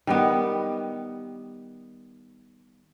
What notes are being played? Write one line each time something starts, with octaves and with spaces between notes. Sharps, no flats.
D#3 G3 B3